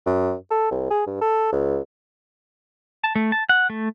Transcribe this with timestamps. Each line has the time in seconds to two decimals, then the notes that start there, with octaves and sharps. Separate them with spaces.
0.06 F#2
0.51 A4
0.71 C2
0.91 G#4
1.07 G2
1.21 A4
1.52 C#2
3.04 A5
3.15 A3
3.32 A5
3.49 F#5
3.70 A3